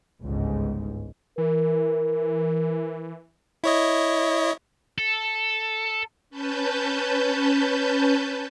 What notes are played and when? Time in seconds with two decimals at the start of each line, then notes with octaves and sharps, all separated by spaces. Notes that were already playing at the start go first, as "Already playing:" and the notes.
0.21 G1 C#2 G#2
1.38 E3 A#4
3.64 E4 C#5 D#5
4.98 A4
6.30 C#4 B4 A5 G6